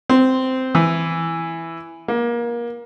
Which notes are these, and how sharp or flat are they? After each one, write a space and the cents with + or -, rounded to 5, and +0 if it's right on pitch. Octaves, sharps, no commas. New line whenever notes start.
C4 -10
E3 +5
A#3 +25